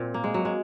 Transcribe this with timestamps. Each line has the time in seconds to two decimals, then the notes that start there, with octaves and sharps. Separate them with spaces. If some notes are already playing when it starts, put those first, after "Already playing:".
Already playing: A#2 C4
0.14 A#3
0.24 G#3
0.34 F#3
0.45 G#3